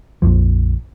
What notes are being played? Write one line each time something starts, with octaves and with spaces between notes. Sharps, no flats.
A#1 F2 F3